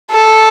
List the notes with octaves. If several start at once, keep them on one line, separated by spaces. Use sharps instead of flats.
A4